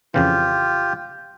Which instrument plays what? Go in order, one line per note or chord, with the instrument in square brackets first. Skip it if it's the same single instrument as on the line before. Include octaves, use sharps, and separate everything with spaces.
[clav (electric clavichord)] F2 C#3 E3 [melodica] F4 G4